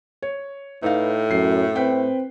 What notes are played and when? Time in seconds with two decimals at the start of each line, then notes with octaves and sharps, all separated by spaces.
0.22 C#5
0.83 A2 D#4 B4 F5
1.31 F#2 C7
1.75 C4 B4 G5